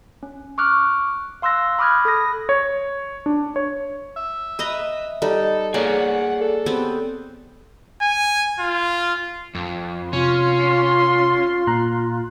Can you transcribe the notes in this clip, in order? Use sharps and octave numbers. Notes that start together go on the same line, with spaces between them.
C#4
C#6 D6 F6 F#6
F5 C6 E6 F#6 A#6
B5 D6 D#6 F6 F#6 G#6
A4 B5 D#6 A#6
C#5
D4
C#5
E5
B4 D#5 A#5
G3 D#4 A4
A#3 G#4 C#5 D5 F#5
A4
B3 C4 G4
G#5
F4
F2
C3 C#4 F4 C6
A#2 A#5 F#6